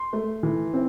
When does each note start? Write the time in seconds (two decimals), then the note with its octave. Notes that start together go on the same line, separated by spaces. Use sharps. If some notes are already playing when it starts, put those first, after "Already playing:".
Already playing: C6
0.13 A3
0.43 E3
0.74 C4